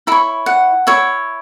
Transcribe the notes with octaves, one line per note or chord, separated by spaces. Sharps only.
E4 C#5 B5
F#5
E4 C#5